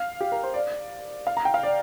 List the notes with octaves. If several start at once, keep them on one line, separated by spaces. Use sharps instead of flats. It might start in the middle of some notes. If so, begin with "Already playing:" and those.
Already playing: F5
G4
A#4
C5
D5
F5
A#5
G5
F5
D5